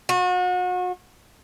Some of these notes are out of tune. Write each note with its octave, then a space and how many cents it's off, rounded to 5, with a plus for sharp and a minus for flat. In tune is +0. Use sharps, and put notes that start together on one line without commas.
F#4 -35